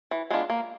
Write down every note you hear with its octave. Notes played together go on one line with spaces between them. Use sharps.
E3
G#3 B3 D4 F4
A#3